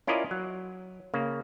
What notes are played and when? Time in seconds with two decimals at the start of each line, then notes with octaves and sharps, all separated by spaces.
0.07 C#4 E4 F4 A#4 D5 D#5
0.31 F#3
1.14 C#3 A#3